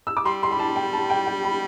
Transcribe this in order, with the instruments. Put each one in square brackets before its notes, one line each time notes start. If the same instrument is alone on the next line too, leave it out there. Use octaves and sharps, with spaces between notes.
[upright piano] E6
D6
[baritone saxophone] G3 [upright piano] C6
[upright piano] C6
B5
A5
G5
A5
G5
G5
B5